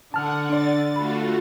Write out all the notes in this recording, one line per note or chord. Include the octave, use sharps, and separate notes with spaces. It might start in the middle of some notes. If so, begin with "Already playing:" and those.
D3 F#5 A5 F6
D4 D5 A6
A3 F4 F#4 B5